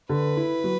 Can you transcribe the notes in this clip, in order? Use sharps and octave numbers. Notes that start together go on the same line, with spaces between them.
D3 B4
E4
F#3